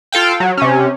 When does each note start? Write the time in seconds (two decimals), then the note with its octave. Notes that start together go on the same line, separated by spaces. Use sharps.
0.12 F4 A4 F5 G5
0.40 F#3
0.57 C3 C#4